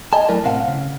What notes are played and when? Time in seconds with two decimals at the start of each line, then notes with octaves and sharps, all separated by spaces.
0.13 D#5 G#5 A5
0.29 F#3 A3 E4 A#4 D5
0.44 A2 C3 C4 F5 F#5
0.68 C#3